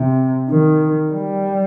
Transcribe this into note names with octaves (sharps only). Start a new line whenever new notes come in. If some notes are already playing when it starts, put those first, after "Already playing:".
Already playing: C3
D#3
G3